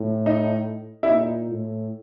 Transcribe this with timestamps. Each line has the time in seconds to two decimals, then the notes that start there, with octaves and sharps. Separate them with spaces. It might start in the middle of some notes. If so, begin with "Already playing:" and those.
Already playing: A2
0.26 D#4
1.03 E4
1.09 A#2 D#4
1.50 A2